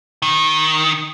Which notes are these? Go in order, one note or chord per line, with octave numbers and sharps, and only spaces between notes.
D#3